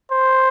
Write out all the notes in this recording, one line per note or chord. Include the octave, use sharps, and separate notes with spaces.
C5